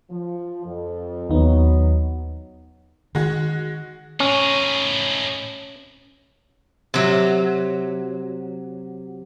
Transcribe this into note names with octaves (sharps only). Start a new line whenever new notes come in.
F3
F2
D#2 F#3 B3 D#4
D#3 G#3 F#4
A2 C#4 D#4
C3 F#3